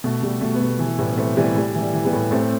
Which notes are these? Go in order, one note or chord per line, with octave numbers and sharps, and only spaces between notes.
B2 A3
B2 G3
B2 A3
B3
B2 A3
E3 A3
A2 G3 B3
B3
E3 A3 C4
E3 G3 B3
A2 G3
E3
G3
E3
G3 B3
A2
A2 A3 C4